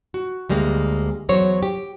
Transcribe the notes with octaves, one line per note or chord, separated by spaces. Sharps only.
F#4
D2 G3 G#3 A#3
E2 F#3 C5 C#5
G4